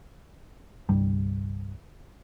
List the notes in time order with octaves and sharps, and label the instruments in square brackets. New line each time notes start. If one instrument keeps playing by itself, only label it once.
[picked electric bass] G1 C2 G2 G3